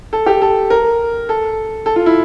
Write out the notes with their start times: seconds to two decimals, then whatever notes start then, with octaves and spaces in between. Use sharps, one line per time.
0.13 A4
0.26 G4
0.42 A4
0.70 A#4
1.29 A4
1.86 A4
1.96 F4
2.06 E4